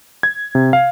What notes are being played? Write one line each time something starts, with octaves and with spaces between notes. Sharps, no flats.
G#6
C3
F5